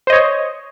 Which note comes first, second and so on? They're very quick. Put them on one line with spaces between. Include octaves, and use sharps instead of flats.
C5 D#5 C#5